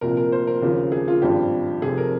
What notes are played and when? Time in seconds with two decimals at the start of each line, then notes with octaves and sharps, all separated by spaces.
0.01 C2 A#2 F3 A#4
0.17 A#4
0.32 C5
0.47 A#4
0.62 D#2 C#3 F3
0.92 G#4
1.08 F4
1.22 G#1 G2 F3 G4
1.82 F1 F2 C3 G#4
1.98 A#4